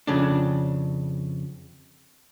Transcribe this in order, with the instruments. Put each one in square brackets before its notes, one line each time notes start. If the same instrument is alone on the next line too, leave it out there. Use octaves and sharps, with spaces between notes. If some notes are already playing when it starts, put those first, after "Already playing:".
[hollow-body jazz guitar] F2 C#3 D4